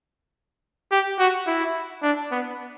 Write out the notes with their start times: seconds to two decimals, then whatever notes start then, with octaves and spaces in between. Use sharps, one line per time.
0.92 G4
1.19 F#4
1.47 E4
2.03 D4
2.32 B3